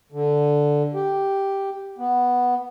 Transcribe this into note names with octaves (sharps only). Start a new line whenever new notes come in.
D3
G4
B3